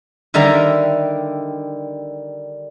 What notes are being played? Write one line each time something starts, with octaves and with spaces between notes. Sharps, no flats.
D3 D#3 G3 A#4 E5 A#5